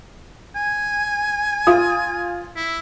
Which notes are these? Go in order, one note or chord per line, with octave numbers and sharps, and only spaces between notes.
G#5
F4 D#6
E4